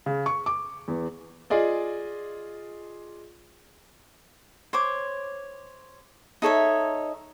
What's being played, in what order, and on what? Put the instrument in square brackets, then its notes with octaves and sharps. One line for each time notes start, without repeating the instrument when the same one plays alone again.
[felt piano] C#3
C#6
D6
E2
[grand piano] F4 G#4 D5 D#5
[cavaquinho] C5 C#5 D6
D#4 A4 C#5 E5